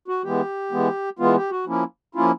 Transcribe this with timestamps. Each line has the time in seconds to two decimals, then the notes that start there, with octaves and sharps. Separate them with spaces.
0.08 F#4
0.24 E3 G#3 B3 G4
0.72 E3 G#3 B3
1.19 E3 G#3 B3 F4
1.36 G4
1.51 F#4
1.67 F3 A#3 C#4 E4
2.15 F3 A#3 C#4 E4 F4